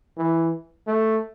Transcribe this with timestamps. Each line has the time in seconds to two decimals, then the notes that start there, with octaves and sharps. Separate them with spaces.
0.17 E3
0.87 A3